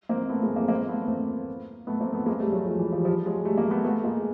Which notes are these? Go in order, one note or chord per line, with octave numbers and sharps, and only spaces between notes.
A#3 C4
A3 B3
G#3 A#3
A#3 C4
A#3 C4
A3 B3
A#3 C4
A3 B3
A#3 C4
A3 B3
G#3 A#3
G3 A3
F#3 G#3
F3 G3
E3 F#3
F3 G3
F3 G3
F#3 G#3
G3 A3
G#3 A#3
A3 B3
A3 B3
G#3 A#3